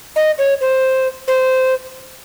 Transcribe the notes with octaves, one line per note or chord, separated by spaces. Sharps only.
D#5
C#5
C5
C5